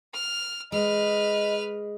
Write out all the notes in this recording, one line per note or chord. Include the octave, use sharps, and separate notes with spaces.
F6
G#3 B4 D#5 F6